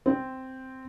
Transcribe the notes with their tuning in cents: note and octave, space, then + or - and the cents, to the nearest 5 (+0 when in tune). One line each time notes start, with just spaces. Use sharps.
C4 -5